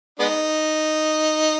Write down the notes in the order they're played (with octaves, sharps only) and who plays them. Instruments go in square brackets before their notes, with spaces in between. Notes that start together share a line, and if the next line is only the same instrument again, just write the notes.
[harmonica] G#3 B3 D#4